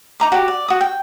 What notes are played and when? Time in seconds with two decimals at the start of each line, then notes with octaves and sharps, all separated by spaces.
0.20 D#4 A#5 D6
0.32 F#4 G4
0.48 D5
0.68 F#4 D#6
0.81 G5